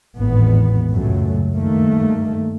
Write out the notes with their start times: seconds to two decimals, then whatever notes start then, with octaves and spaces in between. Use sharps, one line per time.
0.18 G#1 E2 A2 B3
0.91 C#2 F#2 A#2 F#3 A3
1.54 G2 D#3 A3 A#3